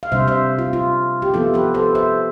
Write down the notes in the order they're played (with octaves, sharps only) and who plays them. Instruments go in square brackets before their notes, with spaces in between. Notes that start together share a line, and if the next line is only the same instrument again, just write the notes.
[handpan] F5
C3 G3 D4 C5 E5
C5 E5
F4
F4
G4
F3 B3 E4 F4 A4
G4 B4
A4 C5
C5 E5